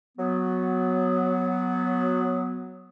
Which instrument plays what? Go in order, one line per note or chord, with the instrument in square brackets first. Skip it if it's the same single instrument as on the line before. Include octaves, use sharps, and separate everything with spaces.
[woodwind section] F#3 B3